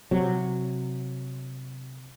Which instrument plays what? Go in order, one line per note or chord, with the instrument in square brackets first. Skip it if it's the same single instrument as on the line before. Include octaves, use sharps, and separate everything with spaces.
[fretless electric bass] C3 F#3